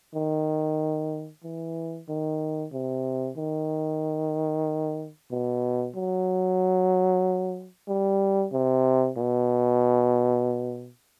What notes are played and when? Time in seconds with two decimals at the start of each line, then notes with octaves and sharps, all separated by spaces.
0.15 D#3
1.44 E3
2.09 D#3
2.72 C3
3.37 D#3
5.31 B2
5.95 F#3
7.88 G3
8.53 C3
9.17 B2